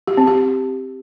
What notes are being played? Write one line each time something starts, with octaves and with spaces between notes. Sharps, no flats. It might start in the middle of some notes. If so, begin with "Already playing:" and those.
G4
C4
G4